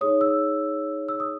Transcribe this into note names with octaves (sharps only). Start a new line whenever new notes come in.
D#4 G#4 C#5 D#6
E6
E6
D#6